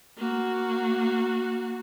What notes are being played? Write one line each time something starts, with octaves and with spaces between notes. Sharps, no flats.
A#3 F#4